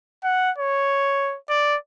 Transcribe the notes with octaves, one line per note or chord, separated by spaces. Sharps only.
F#5
C#5
D5